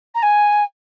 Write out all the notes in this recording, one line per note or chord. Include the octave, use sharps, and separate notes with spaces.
A#5
G#5